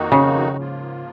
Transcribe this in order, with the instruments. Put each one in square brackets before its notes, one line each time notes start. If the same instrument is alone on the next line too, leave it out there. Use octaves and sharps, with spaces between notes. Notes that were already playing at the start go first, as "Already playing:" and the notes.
Already playing: [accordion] F2 D#3 A#3 D#4 F#4
[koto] C#3
[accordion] G#2 F3 A#3 F4